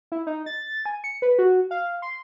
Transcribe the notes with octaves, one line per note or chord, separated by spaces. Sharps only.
E4
D#4
A6
G#5
C#7
B4
F#4
F5
C6